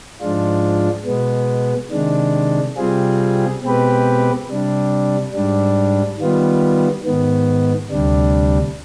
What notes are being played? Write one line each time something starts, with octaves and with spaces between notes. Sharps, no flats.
G#2 F3 G#3 D4 F4
B2 G#3 B3
C3 D#3 G#3 D4
C3 G3 C4 F4 G#4
B2 G#3 C4 G4 B4
C3 G3 D4
G#2 G3 D4
D#3 G3 B3 F4
G#2 D#3 B3
D2 C3 G3 D4